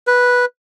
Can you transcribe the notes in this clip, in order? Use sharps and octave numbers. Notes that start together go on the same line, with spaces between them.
B4